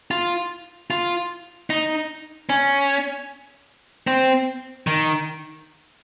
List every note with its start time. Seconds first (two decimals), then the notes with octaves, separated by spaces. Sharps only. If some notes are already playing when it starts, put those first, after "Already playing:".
0.11 F4
0.90 F4
1.70 D#4
2.49 C#4
4.07 C4
4.87 D#3